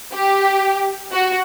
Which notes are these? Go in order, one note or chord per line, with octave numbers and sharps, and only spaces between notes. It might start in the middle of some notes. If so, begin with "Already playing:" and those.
G4
F#4